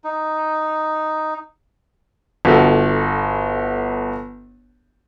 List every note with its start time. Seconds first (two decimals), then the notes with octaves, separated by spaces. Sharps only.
0.04 D#4
2.45 G1 F#4 A4